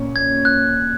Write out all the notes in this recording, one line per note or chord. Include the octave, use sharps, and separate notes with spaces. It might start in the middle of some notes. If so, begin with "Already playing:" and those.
Already playing: A#2 C#4
G#6
F#6